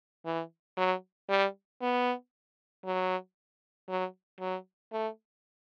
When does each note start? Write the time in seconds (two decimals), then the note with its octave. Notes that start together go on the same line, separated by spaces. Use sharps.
0.25 E3
0.78 F#3
1.30 G3
1.82 B3
2.85 F#3
3.89 F#3
4.40 F#3
4.92 A3